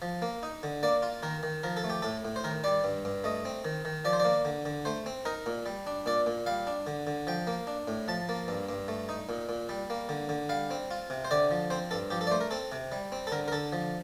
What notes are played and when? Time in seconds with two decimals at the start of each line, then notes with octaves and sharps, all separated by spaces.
0.02 F3
0.22 A#3
0.43 D#4
0.63 D3
0.83 A#3 D5
1.03 F4
1.23 D#3 A#4
1.43 D#3
1.63 F3 A#4
1.77 A4
1.84 A3
1.90 G4
2.02 A2 A4
2.25 A2
2.36 C5
2.44 D#3 A#4
2.64 G3 D5
2.84 G2
3.05 G2
3.24 A3 D#5
3.45 C4
3.65 D#3
3.85 D#3
4.05 F3 D5
4.13 C5
4.20 D5
4.25 A#3
4.45 D3
4.65 D3
4.85 A3 C5
5.06 C4
5.26 D#4 A#4
5.46 A#2
5.66 G3
5.87 D4
6.06 A#2 D5
6.26 A#2
6.46 G3 F5
6.67 D4
6.87 D3
7.07 D3
7.27 F3 G5
7.47 A#3
7.67 D4
7.88 A2
8.08 F3 A5
8.29 A#3
8.48 G2
8.69 G2
8.88 A3
9.09 D#4
9.29 A#2
9.49 A#2
9.69 G3
9.90 A#3
10.09 D3
10.29 D3
10.49 G3 F5
10.71 C4
10.91 F4
11.10 C3
11.25 C5
11.31 D3 D5
11.51 F3
11.70 C4 C5
11.91 G2 A4
12.10 F3 G4
12.21 A4
12.27 D5
12.31 A3 C5
12.41 A#4
12.51 C4 A4
12.72 C3
12.92 G3
13.12 C4
13.27 A4
13.31 D3 A#4
13.48 A#4
13.52 D3 A4
13.72 F3